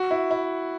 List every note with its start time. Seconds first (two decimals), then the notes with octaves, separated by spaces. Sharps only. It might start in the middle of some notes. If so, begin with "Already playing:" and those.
Already playing: F#4
0.11 E4
0.31 E4